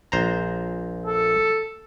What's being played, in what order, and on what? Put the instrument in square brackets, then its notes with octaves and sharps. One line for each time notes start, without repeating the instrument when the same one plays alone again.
[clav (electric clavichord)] A#1 C5 A#5
[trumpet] A4